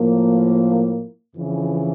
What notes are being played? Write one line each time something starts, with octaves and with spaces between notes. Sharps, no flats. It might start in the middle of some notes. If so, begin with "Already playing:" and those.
Already playing: A2 F3 A#3
F2 C#3 E3